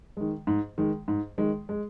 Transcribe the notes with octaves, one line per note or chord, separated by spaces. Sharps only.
D#3 G#3
G#2
D#3 G#3
G#2
D#3 G#3
G#3